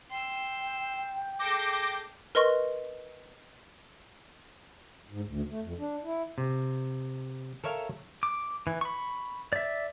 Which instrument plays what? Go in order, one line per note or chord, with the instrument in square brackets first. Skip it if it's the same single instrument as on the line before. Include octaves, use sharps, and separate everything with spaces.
[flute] G5 [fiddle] C6 E6
[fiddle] G#4 A4 [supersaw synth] D6 G6 A#6
[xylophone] A#4 B4 D#5 C6 C#6
[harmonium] G#2
D2
A3
F2
D4
E4
[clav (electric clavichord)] C3
A4 A#4 C#5 E5 F5
[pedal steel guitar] D6
E3
B5 C#6
D5 E5